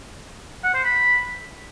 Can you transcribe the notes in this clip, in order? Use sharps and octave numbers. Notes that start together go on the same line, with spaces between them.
F#5
C5
B5